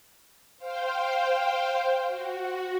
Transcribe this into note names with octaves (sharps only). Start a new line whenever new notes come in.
C5 F5 G5
F#4